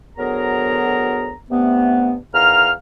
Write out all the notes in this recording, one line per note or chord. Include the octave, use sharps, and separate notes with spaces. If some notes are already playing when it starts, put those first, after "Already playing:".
D2 F#3 B3 G#4 A#4 A#5
G2 C3 A3 B3
E2 D#3 F5 A#5 F6